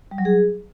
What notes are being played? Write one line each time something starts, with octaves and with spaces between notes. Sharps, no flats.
G3
F#3
G#4